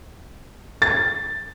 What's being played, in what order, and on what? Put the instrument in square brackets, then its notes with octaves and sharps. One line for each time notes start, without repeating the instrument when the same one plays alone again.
[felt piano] A6